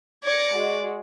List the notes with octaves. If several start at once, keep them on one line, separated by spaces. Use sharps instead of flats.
D5 G#6 A#6 C#7
G#3 F#4